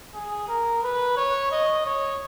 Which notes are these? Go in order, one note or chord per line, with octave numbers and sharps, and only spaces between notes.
G#4
A#4
B4
C#5
D#5
C#5